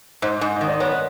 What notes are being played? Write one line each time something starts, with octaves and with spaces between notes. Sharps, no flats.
G#2 C5
G#2
D#3 D#5
D5
B3 C#5